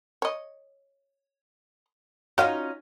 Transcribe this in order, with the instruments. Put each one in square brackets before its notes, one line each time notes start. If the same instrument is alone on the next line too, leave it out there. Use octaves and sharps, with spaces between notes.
[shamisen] C#5 D#5
[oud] C#4 D#4 F4 [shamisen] F#4 F5